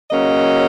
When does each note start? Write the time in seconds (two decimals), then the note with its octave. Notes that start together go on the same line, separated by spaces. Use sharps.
0.11 C#3 F#3 A#3 C#4 D#5